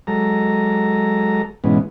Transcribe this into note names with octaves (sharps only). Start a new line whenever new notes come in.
F#3 G#3 A4 A#5
G#2 B2 E3 G#3 B3 C#4